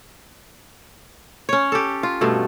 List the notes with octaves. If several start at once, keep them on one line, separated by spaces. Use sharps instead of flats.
C#4 C#5
G4 A4
F4
G2 B2 A3